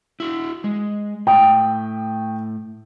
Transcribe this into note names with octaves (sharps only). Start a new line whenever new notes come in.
E4 F#4
G#3
A2 G5 D#6